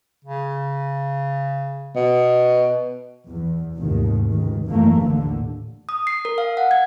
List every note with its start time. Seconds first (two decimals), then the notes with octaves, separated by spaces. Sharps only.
0.25 C#3
1.96 B2
3.27 E2
3.78 F1 D#2 G#2 D#3
4.31 C#2 D#3
4.67 F#2 E3 A3 A#3
5.01 A1 D#2 A2 D3
5.89 D#6
6.07 C7
6.25 A#4
6.38 F5
6.57 F#5
6.71 G#6